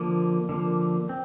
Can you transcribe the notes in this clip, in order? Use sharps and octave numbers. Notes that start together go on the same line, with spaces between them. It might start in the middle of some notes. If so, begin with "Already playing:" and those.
Already playing: D3 F3 A#3
D3 F3 A#3
C4